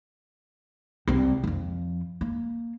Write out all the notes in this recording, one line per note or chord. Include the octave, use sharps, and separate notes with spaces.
C2 C4
F2 F3
A#3